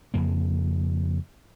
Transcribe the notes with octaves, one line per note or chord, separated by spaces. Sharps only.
F2 C#3 A#3